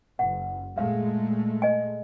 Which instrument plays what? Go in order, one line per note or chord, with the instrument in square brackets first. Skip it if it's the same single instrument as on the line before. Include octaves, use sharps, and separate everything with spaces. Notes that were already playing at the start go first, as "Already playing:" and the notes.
[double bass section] F#1 [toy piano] F#5
[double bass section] A#2 G#3 A3 [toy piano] F5
[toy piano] D#5 G#5